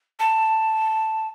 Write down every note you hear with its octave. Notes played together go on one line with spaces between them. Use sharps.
A5